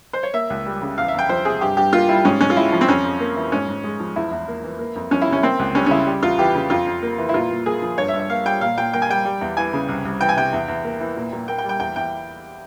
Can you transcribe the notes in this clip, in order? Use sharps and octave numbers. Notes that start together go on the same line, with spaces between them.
C5
C#5
A#3 E5
C#2
G3
C#3
E2 F5
E5
E2 G5
F3 C5
C3 G#4
G2 G4
G2 G4
A#3 F4
G3 E4
G#2 C#4
G#2 C#4
F4
G#3 E4
F3
C4
F2 C#4
F2
A#3
E3
G#2 C#4
G#2
G#3
F3
E2 E4
E2
A#3
E3
A#3
F2
F3 C#4
E4
C3 C#4
A#3 C4
C#2
G3 C#4
C#4
C#3 E4
G3
E2 F4
E3 G4
C#3
F2 F4
F2
A#3
E3
E4
A#2 F4
A#2
A#3 G#4
F3
G2 C#5
E5
G2
E5
A#3 F5
G3 G5
A#2 F5
A#2 G5
A#3 G5
G#5
G3 G5
G3
E2
E3 G#5
C#3
C2
C2
E3 G5
G#5
C3 G5
E2
E2
A#3
E3
A#2
A#2
A#3 G5
G5
G3
G5
E2 G5
E2 G5